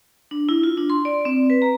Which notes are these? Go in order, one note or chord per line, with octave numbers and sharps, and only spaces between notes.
D4
E4
F4
D4
C6
D5
C4
B4
A#5